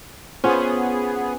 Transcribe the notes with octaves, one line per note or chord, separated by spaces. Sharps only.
B3 C#4 F4 G#4 C5